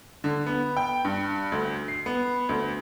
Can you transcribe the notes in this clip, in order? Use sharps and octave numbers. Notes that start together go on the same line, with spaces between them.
D3
B3
G5
G2
D2
C7
B3
D2